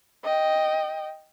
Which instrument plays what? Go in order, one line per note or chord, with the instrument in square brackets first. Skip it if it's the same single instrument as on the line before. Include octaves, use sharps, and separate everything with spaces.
[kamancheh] D#5 G5